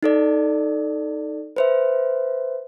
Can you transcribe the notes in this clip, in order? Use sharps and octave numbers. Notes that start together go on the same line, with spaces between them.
D#4 A4 D5
B4 C5 E5